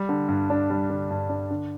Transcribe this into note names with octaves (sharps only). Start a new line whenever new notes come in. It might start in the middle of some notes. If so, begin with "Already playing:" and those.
Already playing: G3
D3
G2
D4
G3
D3
G2
D4
D3